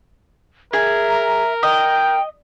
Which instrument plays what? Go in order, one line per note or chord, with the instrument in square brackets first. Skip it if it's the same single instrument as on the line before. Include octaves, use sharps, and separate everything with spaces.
[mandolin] G#4 [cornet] A#4 [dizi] E5
[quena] A#5
[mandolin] D#5 [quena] G5 [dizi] G6